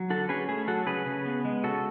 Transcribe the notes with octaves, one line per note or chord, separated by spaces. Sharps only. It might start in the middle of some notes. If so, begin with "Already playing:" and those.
Already playing: F#3
D3 F#4 A4
C#4 G#4 B4
A3 G#4
F#3 F#4 A4
C#3 G#4 B4
C#3
B3
G#3
C#3 F#4 A4